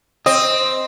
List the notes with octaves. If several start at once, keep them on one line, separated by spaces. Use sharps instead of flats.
C4 D#5